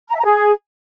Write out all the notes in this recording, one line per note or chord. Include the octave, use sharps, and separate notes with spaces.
A#5
E5
A#5
G#4